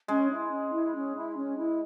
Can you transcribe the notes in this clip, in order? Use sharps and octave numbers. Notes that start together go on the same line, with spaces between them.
G#3 C#4
E4
C#4
E4
C#4
E4
C#4
E4